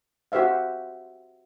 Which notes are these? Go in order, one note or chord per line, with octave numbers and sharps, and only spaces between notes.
F#4 G4 C5 E5 F5